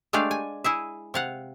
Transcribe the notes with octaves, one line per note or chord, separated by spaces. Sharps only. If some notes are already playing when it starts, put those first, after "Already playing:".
G#3 A3 D4 G4 D5 F5
G#5
E4 G#4 E5
C3 F5 F#5